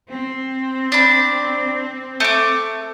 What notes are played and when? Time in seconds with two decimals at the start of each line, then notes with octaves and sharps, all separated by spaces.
0.12 C4
0.92 D4 B5
2.20 A3 D6